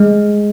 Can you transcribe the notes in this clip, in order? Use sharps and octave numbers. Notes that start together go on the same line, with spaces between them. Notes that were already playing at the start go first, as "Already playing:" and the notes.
Already playing: G#3